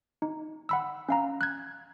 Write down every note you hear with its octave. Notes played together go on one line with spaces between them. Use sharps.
D#4
F#5 B5 E6
C#4 F5 A#5
F#6 G#6